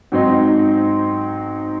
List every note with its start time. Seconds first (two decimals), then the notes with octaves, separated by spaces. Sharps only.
0.12 G#2 F#3 C4 D#4